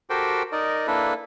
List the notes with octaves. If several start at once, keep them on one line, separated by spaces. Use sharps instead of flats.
F#4 G4 A4 A#4 C5 G5
D#4 A#4 D5 D#5
A#3 D4 E4 A4 B4